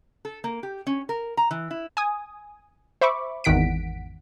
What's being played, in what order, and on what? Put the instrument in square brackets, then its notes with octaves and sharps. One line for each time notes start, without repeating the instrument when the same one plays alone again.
[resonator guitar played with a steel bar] A4
A#3
G4
C#4
A#4
A#5
E3
E4
[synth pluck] G#5 D#6
C5 E5 B5 C#6 D6
G#1 E2 D#3 F#5 B6 D7